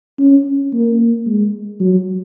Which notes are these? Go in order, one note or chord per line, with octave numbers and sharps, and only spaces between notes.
C#4
A#3
G#3
F#3